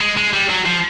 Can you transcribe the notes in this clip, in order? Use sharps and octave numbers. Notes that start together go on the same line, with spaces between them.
G#3
G#3
G3
F#3
F3